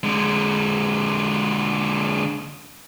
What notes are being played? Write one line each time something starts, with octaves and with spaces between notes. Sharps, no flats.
D3 G#3